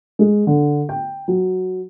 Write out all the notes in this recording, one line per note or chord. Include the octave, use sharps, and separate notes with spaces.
G#3
D3
G5
F#3